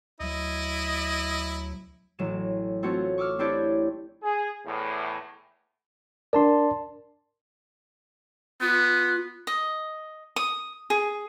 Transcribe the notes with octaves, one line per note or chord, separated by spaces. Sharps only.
D2 F#3 E4 D#5
A1 F#3 E7
A3 C4 F4 F#4 C#5
C#6 D6 E6 F6
C4 D4 E4 G4 C#5 D5
G#4
E2 A2
D4 A#4 D5 A5 C6
B3 F4
D#5
D#6
G#4